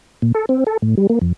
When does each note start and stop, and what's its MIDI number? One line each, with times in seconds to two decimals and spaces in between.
0.22 0.32 46
0.35 0.45 69
0.49 0.64 60
0.67 0.77 69
0.82 0.95 45
0.97 1.07 55
1.10 1.19 58
1.22 1.33 41